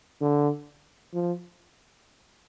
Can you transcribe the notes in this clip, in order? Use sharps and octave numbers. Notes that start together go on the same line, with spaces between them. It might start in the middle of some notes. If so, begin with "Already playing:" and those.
D3
F3